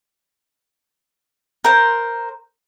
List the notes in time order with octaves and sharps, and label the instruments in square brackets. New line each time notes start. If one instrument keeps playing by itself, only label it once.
[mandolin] A#4 C5